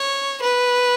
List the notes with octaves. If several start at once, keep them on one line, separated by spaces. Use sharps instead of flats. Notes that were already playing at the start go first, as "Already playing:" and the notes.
Already playing: C#5
B4